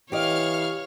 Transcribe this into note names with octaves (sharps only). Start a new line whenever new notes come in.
E3 G4 C#5 D#5 F5 F6